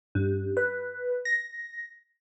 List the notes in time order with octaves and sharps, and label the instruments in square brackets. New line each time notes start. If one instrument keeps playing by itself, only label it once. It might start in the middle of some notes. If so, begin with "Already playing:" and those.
[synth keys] G2
B4
A#6